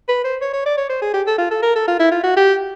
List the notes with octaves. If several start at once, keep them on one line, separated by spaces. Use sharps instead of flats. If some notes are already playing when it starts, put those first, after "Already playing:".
B4
C5
C#5
C#5
D5
C#5
C5
G#4
G4
A4
F4
A4
A#4
A4
F4
E4
F4
F#4
G4